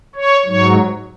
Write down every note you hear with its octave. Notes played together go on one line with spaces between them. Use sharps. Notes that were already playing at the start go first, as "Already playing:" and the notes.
C#5
G#2 F#3 C#5